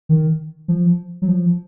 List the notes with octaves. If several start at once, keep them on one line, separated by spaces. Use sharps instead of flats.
D#3
F3
F#3
F3